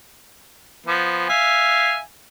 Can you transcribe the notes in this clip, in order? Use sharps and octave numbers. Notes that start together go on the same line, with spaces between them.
F3 B3
E5 F5 G#5